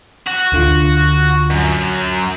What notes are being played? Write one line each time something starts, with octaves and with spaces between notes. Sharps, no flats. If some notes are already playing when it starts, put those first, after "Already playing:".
F#4
D2 D3 F4
F#2